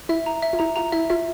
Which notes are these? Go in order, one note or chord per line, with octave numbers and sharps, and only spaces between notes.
E4 E5
A#5
E5
F4
E4 A#5
F4 A#5
E4 E5
F4 E5